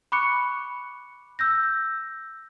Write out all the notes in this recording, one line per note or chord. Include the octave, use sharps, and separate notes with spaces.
B5 C#6 D6 F#6 C#7
E6 G6 A#6